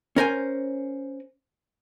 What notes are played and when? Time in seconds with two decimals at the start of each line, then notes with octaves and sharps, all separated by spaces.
0.16 C#4 A#4 C5 G#5